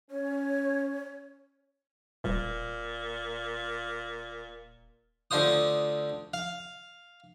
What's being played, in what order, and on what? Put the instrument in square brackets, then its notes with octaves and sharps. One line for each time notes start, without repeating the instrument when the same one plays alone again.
[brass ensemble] C#4 [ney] C#5
[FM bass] D#1 [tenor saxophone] A#2
[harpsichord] D2 D3 F4 C5 D#6
F5